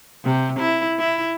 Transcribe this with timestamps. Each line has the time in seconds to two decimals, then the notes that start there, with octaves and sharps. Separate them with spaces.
0.24 C3
0.59 E4
0.99 E4